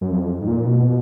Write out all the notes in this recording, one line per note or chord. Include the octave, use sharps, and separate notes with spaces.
F#2
F2
G#2
A#2
B2